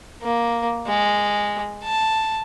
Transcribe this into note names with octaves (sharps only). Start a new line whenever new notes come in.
A#3
G#3
A5